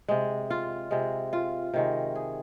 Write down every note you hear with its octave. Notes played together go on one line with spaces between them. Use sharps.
C3 G#3
F4
C3 G#3
F4
C3 D#3 G#3
G#4